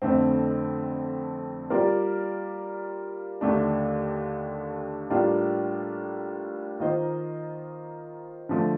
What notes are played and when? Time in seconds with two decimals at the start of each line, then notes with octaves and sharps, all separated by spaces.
0.02 F2 D3 A3 C4
1.70 G3 A#3 F4 A#4 D5
3.41 D#2 D3 A3 D4
5.10 A2 G3 A#3 D4 F4
6.80 D#3 A#3 F4 C5 D#5
8.49 D3 F3 A3